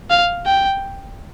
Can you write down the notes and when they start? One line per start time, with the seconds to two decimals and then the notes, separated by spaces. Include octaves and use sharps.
0.10 F5
0.46 G5